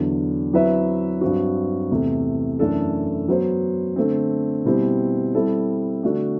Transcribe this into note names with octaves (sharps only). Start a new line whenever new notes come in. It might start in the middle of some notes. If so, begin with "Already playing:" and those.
Already playing: E2 D3 F#3
F#3 C4 E4 B4 E5
G2 F#3 C4 F#4
E2 C3 E3 A3
F#2 E3 A3 D4 A4
F#3 B3 F#4 C5
D3 A3 C4
B2 G3 C4 E4 G4
G3 C4 E4 A4
D3 A3 D4 F#4